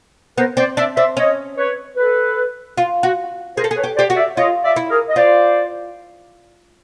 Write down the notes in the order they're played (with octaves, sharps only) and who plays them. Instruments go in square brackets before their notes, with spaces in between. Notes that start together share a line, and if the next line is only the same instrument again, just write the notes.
[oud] B3 [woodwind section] A#4 C5
[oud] C4 [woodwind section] C5 D5
[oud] D4 [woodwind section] D5 E5
[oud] C4 [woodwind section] D5 E5
[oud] C#4 [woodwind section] C#5 D#5
[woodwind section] B4 C#5
A4 B4
[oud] F4
F#4
[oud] G#4 [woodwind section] A#4 C5
[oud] A4
G#4
[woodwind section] B4 C#5
[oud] G4
[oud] G4 [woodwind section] C5 D5
[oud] F#4
[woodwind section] D5 E5
[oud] F4 [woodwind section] C#5 D#5
[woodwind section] D5 E5
[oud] E4
[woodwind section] G#4 A#4
D#5
[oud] F4 [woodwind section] C5 D5